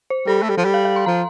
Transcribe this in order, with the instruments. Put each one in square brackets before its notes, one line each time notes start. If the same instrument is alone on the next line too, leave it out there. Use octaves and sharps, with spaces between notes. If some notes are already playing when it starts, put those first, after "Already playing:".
[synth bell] C5
[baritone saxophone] G3 [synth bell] A4
[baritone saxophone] A3
G3
F3
G3
[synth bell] F5
F5
C6
[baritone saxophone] F3 [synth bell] A#5